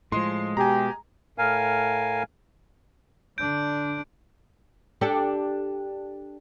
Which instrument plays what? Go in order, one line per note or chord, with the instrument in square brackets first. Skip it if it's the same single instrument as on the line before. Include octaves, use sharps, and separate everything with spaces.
[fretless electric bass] A2 F3 [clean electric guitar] G#3 [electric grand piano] C6
[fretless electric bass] B2 [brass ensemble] G4 [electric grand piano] G#5 A#5
[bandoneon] A2 A#4 F5 G#5
[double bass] D3 D4 [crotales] G6 D7
[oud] D4 G4 A4